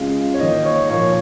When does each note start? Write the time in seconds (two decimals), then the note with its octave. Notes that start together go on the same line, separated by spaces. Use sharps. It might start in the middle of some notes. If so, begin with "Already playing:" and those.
Already playing: C#3 G#3 F4 F5
0.34 C#5
0.39 D#3 A#3 D#4 D#5
0.65 C#5 C#6
0.90 A#2 F3 A#3 C#5 C#6